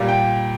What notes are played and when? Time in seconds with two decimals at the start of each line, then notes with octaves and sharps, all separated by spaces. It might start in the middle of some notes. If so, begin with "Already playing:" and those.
Already playing: A#2 G3
0.08 G5